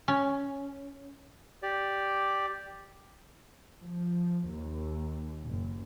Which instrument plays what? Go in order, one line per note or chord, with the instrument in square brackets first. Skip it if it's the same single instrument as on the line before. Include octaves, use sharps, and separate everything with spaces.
[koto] C#4
[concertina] G4 D5
[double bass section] F3
D#2
F#1